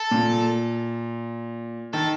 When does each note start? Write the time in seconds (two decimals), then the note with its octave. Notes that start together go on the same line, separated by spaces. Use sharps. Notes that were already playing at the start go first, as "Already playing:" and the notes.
Already playing: A4
0.11 A#2
1.93 D#3 A4